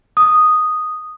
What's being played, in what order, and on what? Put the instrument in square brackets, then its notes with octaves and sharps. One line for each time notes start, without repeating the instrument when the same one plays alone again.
[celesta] D#6